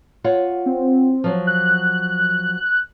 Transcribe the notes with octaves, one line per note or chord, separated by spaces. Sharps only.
F4 C#5 F#5
C4
F3 F#3
F#6